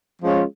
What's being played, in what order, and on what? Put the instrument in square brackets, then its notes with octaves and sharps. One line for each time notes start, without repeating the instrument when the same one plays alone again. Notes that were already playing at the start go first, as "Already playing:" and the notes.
[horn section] F3 G#3 C#4 F4